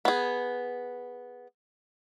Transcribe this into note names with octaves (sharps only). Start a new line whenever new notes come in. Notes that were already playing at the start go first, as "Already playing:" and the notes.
B3 G#4